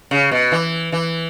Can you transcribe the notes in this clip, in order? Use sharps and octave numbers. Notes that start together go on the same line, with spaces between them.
C#3
B2
E3
E3